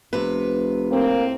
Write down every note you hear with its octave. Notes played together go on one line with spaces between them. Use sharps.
F1 C3 B4
A2 A#3 C4